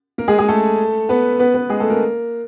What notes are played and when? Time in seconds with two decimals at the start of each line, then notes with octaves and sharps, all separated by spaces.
0.18 A#3 A#4
0.28 G#3 G#4
0.38 G#3 G#4
0.48 A3 A4
1.09 B3 B4
1.39 B3 B4
1.54 B3 B4
1.69 G#3 G#4
1.80 A3 A4
1.90 A#3 A#4